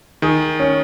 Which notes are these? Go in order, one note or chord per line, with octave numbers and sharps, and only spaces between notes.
D#3 G#4
C#4